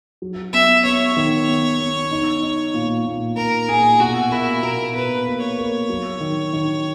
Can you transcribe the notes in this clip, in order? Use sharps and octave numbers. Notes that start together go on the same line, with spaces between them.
F#3
B3 E5
B3 C#5
D#3
B3
B3
D#4
D#4
A#2
A#2
A#2 A#4
A#2 G#4
B2 F#4
A#3 E4
B2 A#4
B2 B4
A#3
C#5
A#3
F#3
D#3
D#3